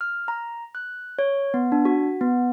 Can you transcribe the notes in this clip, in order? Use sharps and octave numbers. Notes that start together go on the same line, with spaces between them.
F6
A#5
F#6
C#5
B3
D4
F#4
B3